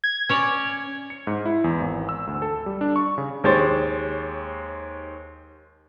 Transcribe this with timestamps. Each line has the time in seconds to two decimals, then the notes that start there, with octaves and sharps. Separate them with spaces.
0.04 G#6
0.29 C#4 C#5 D5
1.10 C#7
1.27 G#2
1.45 E4
1.64 E2
1.80 G#1
2.09 E6
2.27 D2
2.42 A4
2.66 G3
2.81 D4
2.96 C#6
3.18 C#3
3.44 D#2 G#3 G4 C5 C#5 A6